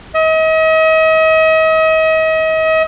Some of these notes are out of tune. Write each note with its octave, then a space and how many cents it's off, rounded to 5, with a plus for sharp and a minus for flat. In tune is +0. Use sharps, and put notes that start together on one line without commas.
D#5 +40